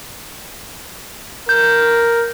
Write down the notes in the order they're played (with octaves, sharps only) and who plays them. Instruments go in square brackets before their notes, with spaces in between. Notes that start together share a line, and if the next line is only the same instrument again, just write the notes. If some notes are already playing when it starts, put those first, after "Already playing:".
[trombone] A#4 [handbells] G6